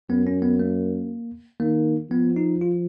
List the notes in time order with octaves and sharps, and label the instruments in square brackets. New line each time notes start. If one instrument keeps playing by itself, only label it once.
[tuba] F#2 [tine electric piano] B3
[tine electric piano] C#4
B3
A#3
[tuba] D#3 [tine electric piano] A#3
[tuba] F3 [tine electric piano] B3
[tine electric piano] D#4
F4